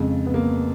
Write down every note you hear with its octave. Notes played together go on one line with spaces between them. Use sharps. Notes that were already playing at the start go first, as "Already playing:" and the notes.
Already playing: F2 C#3 G#3
B3
A#3